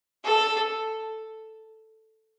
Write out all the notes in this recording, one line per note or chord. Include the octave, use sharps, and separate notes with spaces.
A4